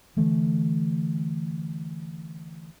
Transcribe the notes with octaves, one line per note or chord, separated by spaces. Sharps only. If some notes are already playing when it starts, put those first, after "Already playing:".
D3 E3 A3